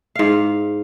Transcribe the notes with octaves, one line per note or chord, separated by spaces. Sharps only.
G#2 F5